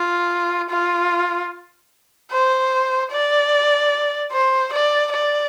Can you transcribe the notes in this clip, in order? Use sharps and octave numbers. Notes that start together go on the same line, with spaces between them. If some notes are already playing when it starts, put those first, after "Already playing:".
Already playing: F4
F4
C5
D5
C5
D5
D5